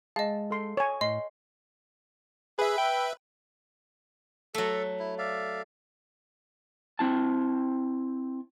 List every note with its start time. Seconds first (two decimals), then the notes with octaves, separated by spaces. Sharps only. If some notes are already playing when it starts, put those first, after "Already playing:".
0.16 G#3 D#5 F5 A5
0.51 A4 C6
0.77 C#5 G#5
1.01 A2 D#5 C6
2.59 G#4 B4 E5
2.78 G5
4.54 F#3 A3 A4
4.99 E4
5.18 D5 E5 F5
6.99 C4 E4 A5